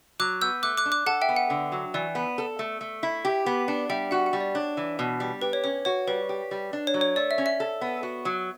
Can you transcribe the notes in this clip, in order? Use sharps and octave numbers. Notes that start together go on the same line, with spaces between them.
F#3 D6 F#6
B3 E6 G6
A3 D6 F#6
D6 F#6
D4
D6 F#6
A4 F#5 A5
E5 G5
B3
F#5
D3
F#3
E3 D5
B3
A4
A3
A3
E4
G4
B3
D4 F#5
G3 E5 G5
F#4 F#5
F#5
G3
D5
D4 C#5
E3
B2
G3
G4 B4
C#5
C#4 C#5
F#4 C#5
G3 B4
G4
G3
D4
C#5
F#3
C#5
A3 D5
E5
C#4
E5
A4
B3
F#4
F#3